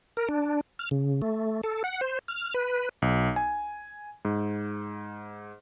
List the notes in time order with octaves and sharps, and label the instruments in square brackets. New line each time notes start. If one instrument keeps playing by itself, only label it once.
[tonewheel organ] A#4
D4
F6
C#3
A3
A4
F#5
C5
F6
B4
[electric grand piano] B1
G#5
G#2